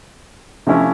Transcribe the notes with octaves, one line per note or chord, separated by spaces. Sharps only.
C3 F3 A3 C#4 E4